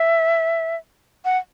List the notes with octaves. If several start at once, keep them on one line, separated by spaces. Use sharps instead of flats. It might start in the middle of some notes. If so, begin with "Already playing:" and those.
Already playing: E5
F#5